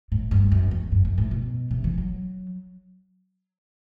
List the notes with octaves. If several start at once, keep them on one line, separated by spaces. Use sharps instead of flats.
A2
G2
F#2
E2
F#2
F#2
A2
B2
C3
E3
F#3